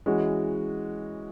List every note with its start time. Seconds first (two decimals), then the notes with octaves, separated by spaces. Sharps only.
0.06 E3 G#3 C#4 F#4